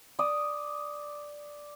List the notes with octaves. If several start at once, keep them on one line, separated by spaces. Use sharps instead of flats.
D5 D#6